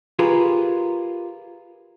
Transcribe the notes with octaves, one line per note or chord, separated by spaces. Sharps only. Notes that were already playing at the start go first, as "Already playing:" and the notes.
F4 G4 G#4 A#4 B4